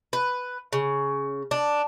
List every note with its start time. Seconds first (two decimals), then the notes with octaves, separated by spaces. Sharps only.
0.13 B4
0.73 C#3
1.51 D4